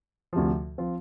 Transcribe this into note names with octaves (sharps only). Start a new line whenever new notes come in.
D2 C3 F3
F3 C4 F4